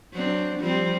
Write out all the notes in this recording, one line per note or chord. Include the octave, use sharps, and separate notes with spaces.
F#3 C4 D4
F3 G3 C4